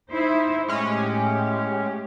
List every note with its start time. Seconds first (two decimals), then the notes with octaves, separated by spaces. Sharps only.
0.12 D#4 E4 C5
0.68 A2 G#3 C#4 G4